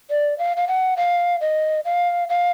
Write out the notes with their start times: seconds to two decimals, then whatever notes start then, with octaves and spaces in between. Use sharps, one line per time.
0.10 D5
0.38 F5
0.57 F5
0.68 F#5
0.97 F5
1.41 D#5
1.85 F5
2.29 F5